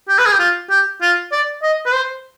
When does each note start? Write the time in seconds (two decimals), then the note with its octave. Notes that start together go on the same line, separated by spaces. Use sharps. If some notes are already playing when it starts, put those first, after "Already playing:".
0.09 G4
0.19 B4
0.26 G#4
0.33 G4
0.39 F4
0.70 G4
1.02 F4
1.32 D5
1.63 D#5
1.86 B4
1.93 C5